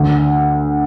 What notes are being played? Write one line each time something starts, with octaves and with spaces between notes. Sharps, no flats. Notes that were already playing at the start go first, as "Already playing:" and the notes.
Already playing: D2